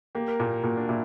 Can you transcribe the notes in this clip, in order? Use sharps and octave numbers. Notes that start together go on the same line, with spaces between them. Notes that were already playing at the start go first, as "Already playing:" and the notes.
A#3 G4
A#4
A#2 G4
A#2 F#4
D4
A#2 E4